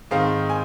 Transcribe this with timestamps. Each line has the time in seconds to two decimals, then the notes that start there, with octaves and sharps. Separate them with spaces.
0.11 G#2 D#3 C4 D#4 F5
0.49 G#5